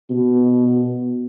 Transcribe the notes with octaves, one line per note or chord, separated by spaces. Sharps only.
B2